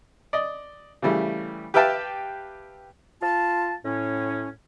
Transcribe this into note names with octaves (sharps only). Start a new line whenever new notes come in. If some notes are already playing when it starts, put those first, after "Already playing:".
D5 D#5
C#3 E3 G3 A3
G4 B4 E5 F5 G5 A5
F4 A5
A2 C#4